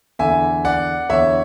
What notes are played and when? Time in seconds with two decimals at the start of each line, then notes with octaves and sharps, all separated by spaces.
0.19 E2 D3 E5 G#5
0.65 D5 F#5
1.10 E2 D3 C#5 E5